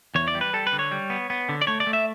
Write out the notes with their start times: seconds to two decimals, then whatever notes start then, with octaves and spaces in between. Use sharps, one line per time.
0.15 E2 C#5
0.28 D5
0.35 G3
0.41 B4
0.53 G3 A4
0.67 B4
0.72 D3
0.79 C#5
0.91 G3
1.10 B3
1.30 B3
1.49 D3
1.62 D5
1.67 A3 C#5
1.80 D5
1.87 A3
1.93 E5